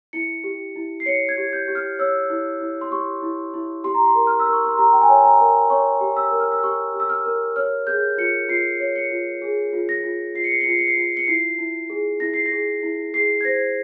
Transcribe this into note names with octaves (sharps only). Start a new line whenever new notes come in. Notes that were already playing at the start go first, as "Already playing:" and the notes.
E4 C#7
G4
E4
C7
C#5 C#7
G#6
G4
G6
G4
F6
C#5 E6
E4
E4
C6
G4 C#6
E4
E4
G4 C6
A#5
C6
A#4
F6
E6
A#4
C#6
C6
G4 A#5
G5
G#5
C#5
A#5
A#4
C#5 C#6
G4
E6
A#4
F6
E6
G4 C#6
G4
E6
F6
A#4
C#5 F6
G#4 G6
F4 C#7
F4 C7
C#5
C#7
F4
G#4
F4
A#6
F4
F4 C7
C#7
C7
C#7
F4 C7
C#7
C7
F4
C#7
E4 C7
E4
G#4
E4 A#6
C7
A#6
G#4
E4
G#4 C7
G#6
C5 A#6